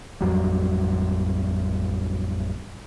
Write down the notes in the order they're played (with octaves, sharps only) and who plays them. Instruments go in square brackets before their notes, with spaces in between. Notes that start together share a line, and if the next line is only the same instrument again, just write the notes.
[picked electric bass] A1 F2 F#3 G3